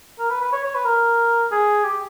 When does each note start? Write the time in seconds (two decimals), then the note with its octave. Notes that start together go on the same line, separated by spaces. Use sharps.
0.19 A#4
0.30 B4
0.41 B4
0.52 C#5
0.64 C#5
0.75 B4
0.85 A#4
1.52 G#4
1.84 G4